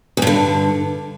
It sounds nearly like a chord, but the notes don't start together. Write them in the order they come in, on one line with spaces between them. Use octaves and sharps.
E2 G2 D3